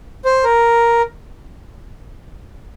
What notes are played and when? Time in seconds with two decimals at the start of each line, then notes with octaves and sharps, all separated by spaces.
0.25 C5
0.44 A#4